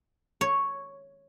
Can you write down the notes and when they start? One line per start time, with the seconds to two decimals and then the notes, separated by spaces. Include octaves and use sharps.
0.41 C#5